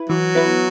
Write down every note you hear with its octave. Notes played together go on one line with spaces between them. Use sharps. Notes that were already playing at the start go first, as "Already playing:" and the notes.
Already playing: E4 B4
E3 F#3
B3 E4 B4